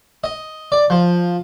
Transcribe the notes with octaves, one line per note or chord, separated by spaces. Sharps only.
D#5
D5
F3